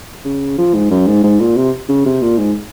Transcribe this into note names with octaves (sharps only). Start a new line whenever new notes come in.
C#3
F3
G#2
F#2
G#2
G#2
A#2
C3
C#3
C3
A#2
G#2